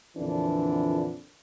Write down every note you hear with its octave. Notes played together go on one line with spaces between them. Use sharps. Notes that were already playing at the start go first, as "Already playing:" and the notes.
F2 A#2 D3 E3 D4